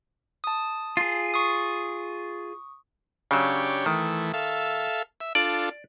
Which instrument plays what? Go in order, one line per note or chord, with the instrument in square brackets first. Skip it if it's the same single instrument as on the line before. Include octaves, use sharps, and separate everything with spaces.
[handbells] A5 D#6
[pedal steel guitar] F4 G#4
[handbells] C#6 D#6
[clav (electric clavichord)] C#3 F#3 [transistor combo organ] D4 G4 C#5
[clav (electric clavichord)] D#3 [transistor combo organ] E3 A3
[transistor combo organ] A4 E5 F5
E5
[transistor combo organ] D4 F4 A4 [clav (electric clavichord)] D5